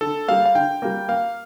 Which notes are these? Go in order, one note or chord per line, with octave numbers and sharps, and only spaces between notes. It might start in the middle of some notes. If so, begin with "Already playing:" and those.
D3 A4
G3 A#3 F5
F5
D3 G5
G3 A#3
A#3 F5